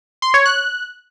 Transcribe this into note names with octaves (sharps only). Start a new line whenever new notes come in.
C6
C#5
F#6